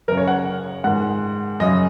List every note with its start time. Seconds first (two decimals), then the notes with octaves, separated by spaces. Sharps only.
0.08 F#2 A#4
0.12 C#3
0.17 C#5
0.28 F#5
0.84 G#2 D#3 F#5
1.60 F#2 C#3 D#5